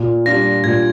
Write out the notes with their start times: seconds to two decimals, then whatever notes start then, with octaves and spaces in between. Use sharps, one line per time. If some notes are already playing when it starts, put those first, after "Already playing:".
Already playing: A#2
0.26 G3 D4 F4 A#6
0.64 A#2 G#6